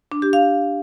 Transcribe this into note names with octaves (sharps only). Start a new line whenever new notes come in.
D4
G4
F5